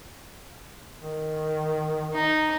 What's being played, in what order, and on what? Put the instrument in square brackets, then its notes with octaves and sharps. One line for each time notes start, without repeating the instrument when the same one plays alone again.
[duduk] D#3
[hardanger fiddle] D#4